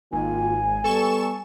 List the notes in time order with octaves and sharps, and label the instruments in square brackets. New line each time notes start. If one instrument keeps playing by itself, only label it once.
[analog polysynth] G#1 [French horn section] D#3 A#3 F4 [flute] G#5
[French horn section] G3 B3 [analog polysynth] A4 C#6 E7